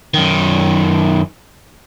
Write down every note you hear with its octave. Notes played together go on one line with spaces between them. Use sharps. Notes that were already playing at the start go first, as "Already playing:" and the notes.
F#2 D#3